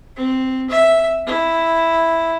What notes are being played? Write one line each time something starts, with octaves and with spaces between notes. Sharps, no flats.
C4
E5
E4